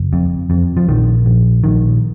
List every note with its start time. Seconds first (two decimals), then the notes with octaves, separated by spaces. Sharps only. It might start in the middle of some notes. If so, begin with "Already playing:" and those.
Already playing: F#1
0.13 F2
0.50 F2
0.77 F3
0.88 A#1 D#3
1.26 A#1
1.64 A#1 D#3